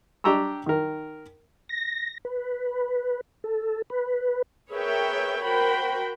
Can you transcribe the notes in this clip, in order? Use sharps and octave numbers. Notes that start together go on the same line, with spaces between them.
D4 G4 G5 A#5 C#6 E6
D#3 A#4
A#6
B4
A4
B4
G#4 A#4 B4 C#5 E5 G5
F#4 A#4 C5 G5 B5